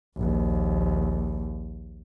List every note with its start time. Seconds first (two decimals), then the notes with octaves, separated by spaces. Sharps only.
0.17 A#1 D#2